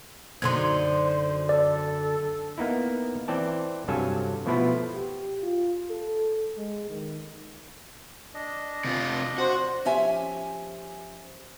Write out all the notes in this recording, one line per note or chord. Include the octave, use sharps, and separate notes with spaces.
F#2 D3 D#4 C5 C6 G#6
A4 D5
A#3 B3 D#4 E4
E3 C4 D5 A5
G2 C3 F#3 A4 F5 G#5
B2 F3 A3 B3 E4 F4
G4
F4
A4
G#3
D#3
D4 D#5
C3 F4
F#4 C5
F3 C#4 G4 E5 G#5